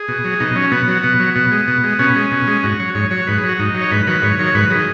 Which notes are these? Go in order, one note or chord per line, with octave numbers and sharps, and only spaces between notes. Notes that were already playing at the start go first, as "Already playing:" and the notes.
Already playing: G#4
B2
F#3
B2 D#4
F#3 C#4
B2 B3
F#3
B2
F#3
B2
G#3
B2
G#3
B2 C#4
G#3
B2
G#3
G#2 F#4
F#3 C#5
G#2 C#5
F#3 C#5
G#2 B4
G#4
F#3
F#4
G#2 D#4
F#3
C#5
G#2 B4
D#3 F#3 B4
G#2 C#5
D#3 F#3 C#5
G#2 B4
D#3 F#3 G#4